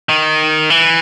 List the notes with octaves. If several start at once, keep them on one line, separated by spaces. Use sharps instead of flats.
D#3
E3